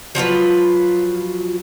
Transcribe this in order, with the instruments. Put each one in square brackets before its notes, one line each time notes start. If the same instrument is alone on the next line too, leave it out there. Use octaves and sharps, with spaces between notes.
[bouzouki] F3 F#3 F4 B4